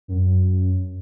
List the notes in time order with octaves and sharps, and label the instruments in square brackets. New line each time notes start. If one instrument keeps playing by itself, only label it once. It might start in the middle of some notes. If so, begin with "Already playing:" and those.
[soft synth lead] F#2